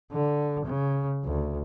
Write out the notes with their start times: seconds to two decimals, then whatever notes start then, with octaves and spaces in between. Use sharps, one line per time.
0.12 D3
0.65 C#3
1.24 D2